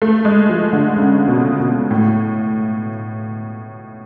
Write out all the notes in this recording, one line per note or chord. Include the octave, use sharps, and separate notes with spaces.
A3
G#3
F3
D3
C#3
B2
B2
A2